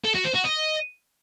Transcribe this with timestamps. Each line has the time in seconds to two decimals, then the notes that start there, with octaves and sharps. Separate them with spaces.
0.05 A4
0.15 F#4
0.25 C5
0.35 F#4
0.45 D#5